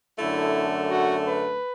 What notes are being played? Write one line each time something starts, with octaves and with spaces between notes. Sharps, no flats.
F#2 D3 A3 E4
F#4
B4